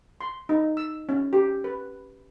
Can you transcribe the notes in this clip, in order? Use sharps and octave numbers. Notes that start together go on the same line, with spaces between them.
C6
D#4
E6
C#4
G4
B4